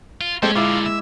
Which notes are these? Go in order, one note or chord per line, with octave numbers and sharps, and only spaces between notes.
F4
G#3 A3 C4 C#4 G4
A#2 D3 E4 F4 D6
E5